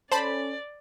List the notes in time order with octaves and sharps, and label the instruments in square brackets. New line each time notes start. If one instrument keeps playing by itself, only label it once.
[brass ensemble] C#4 A4 [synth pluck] C5 A5 B5 [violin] D5